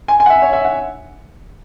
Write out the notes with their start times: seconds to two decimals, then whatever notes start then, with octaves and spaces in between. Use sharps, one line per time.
0.08 G#5
0.20 G#5
0.26 F#5
0.30 E5
0.42 C#5
0.53 E5
0.65 F#5